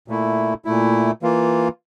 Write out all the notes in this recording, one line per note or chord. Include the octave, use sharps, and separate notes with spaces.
A#2 A3 E4
A#2 A3 E4
E3 A#3 F4